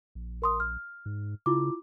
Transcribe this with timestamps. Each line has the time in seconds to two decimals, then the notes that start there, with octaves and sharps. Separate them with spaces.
0.15 A#1
0.42 A#4 C6 D#6
0.60 F6
1.06 G#2
1.46 C#3 E4 F4 D6